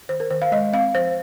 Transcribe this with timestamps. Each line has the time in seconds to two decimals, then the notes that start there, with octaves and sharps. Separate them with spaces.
0.09 D#3 C5
0.20 A#4
0.31 D#3 C5
0.42 F5
0.52 G#3 D#5
0.73 C4 F5
0.95 F3 C5